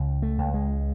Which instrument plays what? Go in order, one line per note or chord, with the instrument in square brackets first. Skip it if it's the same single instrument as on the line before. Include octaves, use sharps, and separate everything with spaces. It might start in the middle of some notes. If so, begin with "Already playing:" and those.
Already playing: [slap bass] C#2 C#3
A3
C#2
G#3